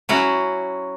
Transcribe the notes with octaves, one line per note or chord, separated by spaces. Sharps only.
F#3 C#4 E4 F#4